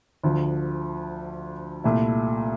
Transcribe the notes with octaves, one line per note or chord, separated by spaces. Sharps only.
D2 D3 F3
C2 A#2 A3 E4